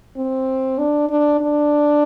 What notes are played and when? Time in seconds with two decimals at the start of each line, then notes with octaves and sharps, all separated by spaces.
0.16 C4
0.78 D4
1.09 D4
1.40 D4